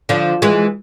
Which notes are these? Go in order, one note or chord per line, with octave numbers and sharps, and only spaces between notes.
D3 F3
E3 G#3